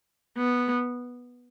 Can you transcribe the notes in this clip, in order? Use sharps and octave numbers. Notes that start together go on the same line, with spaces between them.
B3